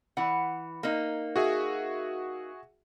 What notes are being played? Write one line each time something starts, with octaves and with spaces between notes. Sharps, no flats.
E3 B4 F#5
A#3 D#4
F#4 G#4 E5